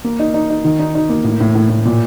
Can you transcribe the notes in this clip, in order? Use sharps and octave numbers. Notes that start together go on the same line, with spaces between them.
A#3
D#4
D#4
D#4
D#3
D#4
D#4
A#3
A2
A2
A2
A2
A#2